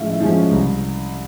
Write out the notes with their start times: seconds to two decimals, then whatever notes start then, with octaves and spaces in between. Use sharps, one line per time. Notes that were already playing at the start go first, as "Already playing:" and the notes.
Already playing: A2 F3 G#3 C#4 E5 F5
0.10 E5
0.20 F3 G#3 C#4
0.31 F5
0.51 C2